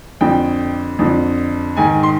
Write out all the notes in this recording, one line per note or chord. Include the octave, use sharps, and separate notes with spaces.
F2 D3 G5
F2 D3
G#2 D#3 G#5
C6